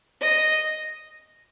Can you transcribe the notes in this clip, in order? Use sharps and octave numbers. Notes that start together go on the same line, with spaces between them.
D#5